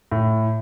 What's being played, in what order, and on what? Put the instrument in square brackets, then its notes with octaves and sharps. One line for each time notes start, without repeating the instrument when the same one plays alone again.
[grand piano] A2